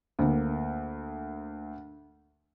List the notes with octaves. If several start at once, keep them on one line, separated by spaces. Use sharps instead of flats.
D2 A#3